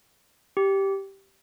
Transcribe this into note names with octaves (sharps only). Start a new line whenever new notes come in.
G4